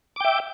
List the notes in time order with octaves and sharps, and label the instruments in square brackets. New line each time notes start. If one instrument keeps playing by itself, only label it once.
[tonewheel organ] D6
G5
E5